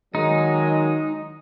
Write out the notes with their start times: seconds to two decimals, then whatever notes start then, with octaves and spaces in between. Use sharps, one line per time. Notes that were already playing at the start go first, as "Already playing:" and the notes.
0.15 D#3 F#3 G#3 D#4